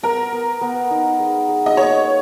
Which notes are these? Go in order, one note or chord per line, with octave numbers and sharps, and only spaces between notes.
B3 A#4
B3
B3
D#4
G#3
G#3
D#5
A#3 C#5